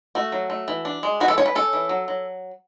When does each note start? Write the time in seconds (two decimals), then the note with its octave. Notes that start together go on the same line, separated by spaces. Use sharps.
0.15 A3 F#4
0.32 F#3
0.50 A3
0.68 E3
0.85 D4
1.03 G#3
1.20 E3 F#4
1.28 A4
1.38 C#4 C#5
1.46 B4
1.55 C#4 A4
1.73 E3
1.89 F#3
2.08 F#3